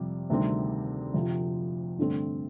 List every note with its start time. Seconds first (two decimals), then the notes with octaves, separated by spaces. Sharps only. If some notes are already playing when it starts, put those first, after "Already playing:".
Already playing: F2 C3 G3
0.30 D2 C3 D#3 G3 C4
1.14 F2 C3 F3
1.98 G2 D3 A3 C4